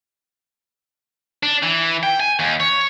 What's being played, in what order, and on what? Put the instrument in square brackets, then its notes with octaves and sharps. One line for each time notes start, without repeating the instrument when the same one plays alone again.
[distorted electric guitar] D4
E3
G5
G#5
D#2
C#5